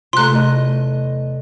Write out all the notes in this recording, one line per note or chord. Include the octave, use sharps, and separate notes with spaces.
C3 A3 F4 A#5 C6 F#6
E2 A3 D#5